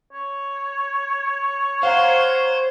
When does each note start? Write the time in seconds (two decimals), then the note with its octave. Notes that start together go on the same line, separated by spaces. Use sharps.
0.13 C#5
1.83 C5 F5 F#5 A#5